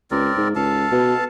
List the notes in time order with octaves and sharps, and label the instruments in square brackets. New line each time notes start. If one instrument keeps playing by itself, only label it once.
[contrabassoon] C#2 [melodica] C4 A#4 D5
[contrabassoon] G#2
[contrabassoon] C#2 [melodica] A4 F5 A5
[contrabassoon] B2